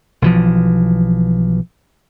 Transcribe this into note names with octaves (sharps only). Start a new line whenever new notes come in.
B1 E3 F3